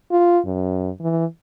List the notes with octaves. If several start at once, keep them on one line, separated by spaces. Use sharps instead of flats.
F4
F#2
E3